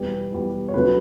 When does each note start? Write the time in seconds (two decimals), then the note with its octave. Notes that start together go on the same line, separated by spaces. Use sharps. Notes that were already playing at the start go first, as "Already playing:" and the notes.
Already playing: E2 B2 G3 B3
0.32 E2 B2 G3 B3
0.68 C#5
0.73 D2 C#3 F#3 B4